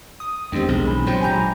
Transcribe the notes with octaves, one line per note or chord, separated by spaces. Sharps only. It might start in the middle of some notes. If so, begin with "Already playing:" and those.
D#6
E2 D#3 G#3 C4 D4 G4
B1 G#4
E3 B5
A#2 F#3 G#3 C5 G5
G#1 G4 G#5 A#5 B5 G6